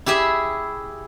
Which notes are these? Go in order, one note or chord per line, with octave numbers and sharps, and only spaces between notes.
E4 G4 G#4 E5